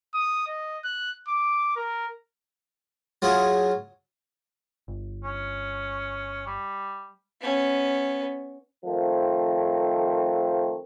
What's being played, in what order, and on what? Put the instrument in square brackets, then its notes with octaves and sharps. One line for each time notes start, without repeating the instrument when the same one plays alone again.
[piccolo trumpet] D#6
D#5
F#6
D6
A#4
[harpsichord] F#3 F4 G#4
[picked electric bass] G1
[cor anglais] C#4
G3
[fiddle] B3 C#4
[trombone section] D#3 F3 A3 C4